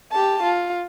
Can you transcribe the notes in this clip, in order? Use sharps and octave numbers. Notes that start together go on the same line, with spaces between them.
G4 A5
F4